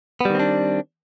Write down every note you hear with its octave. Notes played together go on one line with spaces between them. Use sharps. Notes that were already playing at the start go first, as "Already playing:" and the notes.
D#3 G3 B3 C4 D4